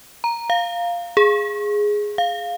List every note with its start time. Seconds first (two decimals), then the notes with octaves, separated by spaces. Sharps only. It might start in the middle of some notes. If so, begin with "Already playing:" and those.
0.24 A#5
0.50 F5
1.17 G#4
2.18 F5